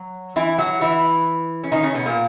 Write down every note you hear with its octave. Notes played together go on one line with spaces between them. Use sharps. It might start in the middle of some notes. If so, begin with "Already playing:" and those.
Already playing: F#3
E3 E4
F#3 F#4
E3 E4
C#4
D#3 D#4
C#3 C#4
B2 B3
A#2 A#3